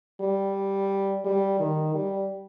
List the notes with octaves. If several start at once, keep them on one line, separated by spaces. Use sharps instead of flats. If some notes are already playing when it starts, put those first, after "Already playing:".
G3
G3
D#3
G3